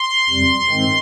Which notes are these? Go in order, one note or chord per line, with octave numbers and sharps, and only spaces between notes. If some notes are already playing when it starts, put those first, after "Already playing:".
Already playing: C6
F2 C3 G3
G#2 D#3 G#3 C4